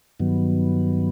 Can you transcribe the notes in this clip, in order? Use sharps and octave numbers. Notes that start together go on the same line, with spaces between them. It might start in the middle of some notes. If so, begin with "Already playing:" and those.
G2 D#3 F#3 B3